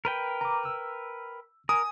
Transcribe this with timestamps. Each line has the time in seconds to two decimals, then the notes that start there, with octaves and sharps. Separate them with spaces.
0.05 A#4 B4 G5
0.41 A#5 D6
0.65 E6
1.69 A#4 G#5 D#6